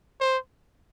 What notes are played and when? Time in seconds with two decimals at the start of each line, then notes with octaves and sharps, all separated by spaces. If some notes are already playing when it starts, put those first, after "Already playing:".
0.21 C5